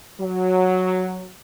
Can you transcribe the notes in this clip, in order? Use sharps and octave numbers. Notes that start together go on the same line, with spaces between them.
F#3